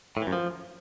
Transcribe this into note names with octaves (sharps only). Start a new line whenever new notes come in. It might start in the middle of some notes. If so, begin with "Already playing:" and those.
A2
E3
F#2
F3